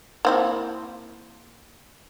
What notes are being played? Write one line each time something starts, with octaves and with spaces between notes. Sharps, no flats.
A#3 C4 E4